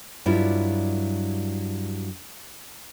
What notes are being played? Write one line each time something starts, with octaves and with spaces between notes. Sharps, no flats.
G2 F#3 G3 E4 F4